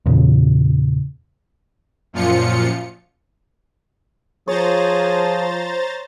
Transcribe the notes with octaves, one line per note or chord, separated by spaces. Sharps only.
E2 A#2 C#3
F#2 A#2 F3 F4 C#7
F3 G#4 C5 C#5 A#5 A6